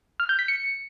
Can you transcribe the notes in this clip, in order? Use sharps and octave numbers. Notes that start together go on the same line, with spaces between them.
F6
G6
B6
C#7